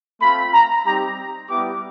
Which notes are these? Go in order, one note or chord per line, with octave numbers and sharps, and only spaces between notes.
A3 C4 F4 B5
A#5
G3 C4 D#4 G4 A#5
G3 B3 E4 G4 D6